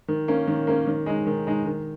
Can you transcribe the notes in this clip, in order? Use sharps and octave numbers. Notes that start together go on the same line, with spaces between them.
D#3
A#3 C#4
D#3
A#3 C#4
D#3
G#3 D#4
D#3
G#3 D#4
D#3